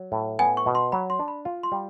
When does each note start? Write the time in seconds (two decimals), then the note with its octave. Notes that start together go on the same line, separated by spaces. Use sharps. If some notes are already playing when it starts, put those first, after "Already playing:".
Already playing: F#3
0.12 A2
0.39 B3 G#5
0.57 C#6
0.66 B2
0.75 C6
0.92 F#3 B5
1.10 C6
1.19 D4
1.28 B5
1.45 F4
1.63 C6
1.72 G3